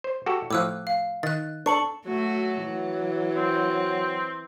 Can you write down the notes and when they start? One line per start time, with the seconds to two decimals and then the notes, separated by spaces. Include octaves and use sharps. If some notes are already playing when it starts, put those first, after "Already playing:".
0.04 C5
0.26 F#4 G4 A4
0.51 A2 F3 D6 E6 F#6
0.87 F5
1.23 D#3 F#6 A6
1.66 D4 A4 C#6 C#7 F#7
2.06 F#3 A3 F#4
2.66 E3
3.37 C4